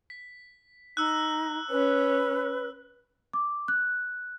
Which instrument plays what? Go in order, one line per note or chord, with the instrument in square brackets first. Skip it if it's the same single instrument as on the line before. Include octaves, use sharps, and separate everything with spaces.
[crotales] B6
[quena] D#4 [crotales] E6 F#6
[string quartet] C#4 [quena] B4
[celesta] D6
F#6